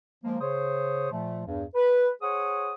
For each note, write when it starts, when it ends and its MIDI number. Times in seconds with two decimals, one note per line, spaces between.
0.24 0.39 53
0.24 0.39 56
0.24 0.39 58
0.41 1.11 49
0.41 1.11 72
0.41 1.11 73
0.41 1.11 87
1.11 1.41 46
1.11 1.41 53
1.11 1.41 57
1.47 1.65 40
1.47 1.65 43
1.75 2.10 71
2.22 2.73 68
2.22 2.73 72
2.22 2.73 73
2.22 2.73 78
2.22 2.73 87